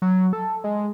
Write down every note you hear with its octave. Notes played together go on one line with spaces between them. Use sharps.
F#3
A4
G#3